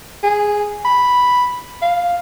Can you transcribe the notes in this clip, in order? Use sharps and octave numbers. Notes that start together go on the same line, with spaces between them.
G#4
B5
F5